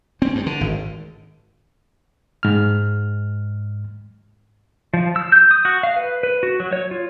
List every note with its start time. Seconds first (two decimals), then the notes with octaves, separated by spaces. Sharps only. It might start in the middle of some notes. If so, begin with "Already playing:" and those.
0.22 C4
0.35 G2
0.46 D3
0.61 G#1
2.43 G#2 F6
4.94 F3
5.16 E6
5.32 G6
5.51 D#6
5.65 F#4
5.83 F5
5.96 B4
6.23 B4
6.43 F#4
6.60 F#3
6.73 C#5
6.91 F4